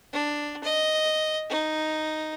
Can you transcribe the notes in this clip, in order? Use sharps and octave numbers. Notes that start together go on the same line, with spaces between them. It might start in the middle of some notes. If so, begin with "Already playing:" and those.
D4
D#5
D#4